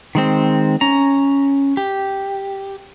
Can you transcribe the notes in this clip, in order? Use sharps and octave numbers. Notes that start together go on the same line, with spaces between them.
D#3 G#3 C4
C#4 A#5
G4